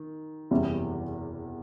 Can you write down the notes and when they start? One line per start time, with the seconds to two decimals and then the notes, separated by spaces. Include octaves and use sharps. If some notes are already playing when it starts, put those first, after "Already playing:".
Already playing: D#3
0.51 F#1 E2 C3 E3 G3